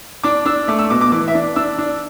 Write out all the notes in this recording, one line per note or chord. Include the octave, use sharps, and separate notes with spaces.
D4 D6
D4 E6
A3 D6
E6
B2 D6
D6
E3 D6
E5
D4
D4 E6
D4